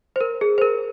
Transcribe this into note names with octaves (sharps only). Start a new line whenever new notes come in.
C5
A#4
G#4
C5
A#4